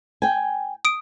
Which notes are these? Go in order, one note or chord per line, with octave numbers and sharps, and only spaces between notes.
G5 G#5
D#6 D7